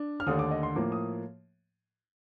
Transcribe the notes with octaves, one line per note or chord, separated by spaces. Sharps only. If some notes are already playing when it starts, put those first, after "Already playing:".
Already playing: D4
F6
D#2 D3 A3 D4 D#6
D6
D#5
C6
A2 F3 A#3 D6
D#6